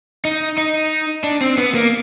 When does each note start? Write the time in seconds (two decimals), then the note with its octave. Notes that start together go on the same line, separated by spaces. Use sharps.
0.25 D#4
0.58 D#4
1.24 D4
1.41 C4
1.58 B3
1.75 A#3